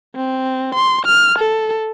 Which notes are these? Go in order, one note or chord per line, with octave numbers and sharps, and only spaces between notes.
C4
C6
F6
A4